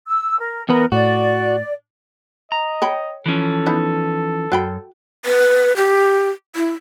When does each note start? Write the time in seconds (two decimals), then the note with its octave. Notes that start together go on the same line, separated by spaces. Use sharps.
0.06 E6
0.39 A#4
0.69 E2 B3 A#4 B4
0.92 A2 F#4 D5
2.52 D#5 A#5
2.82 C#5 G5 B5
3.26 E3 F3 C#4 A4
3.66 B3 D#4 E4
4.52 F#2 F#4 G5 B5
5.25 B4
5.76 G4
6.56 E4